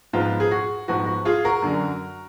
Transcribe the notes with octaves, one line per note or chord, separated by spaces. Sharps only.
G#2 F3 B3 F4
G#4
F#4
G#2 F3 B3 F#4
F#4
F4 G#4
F#4 A#4
F#2 D3 F#3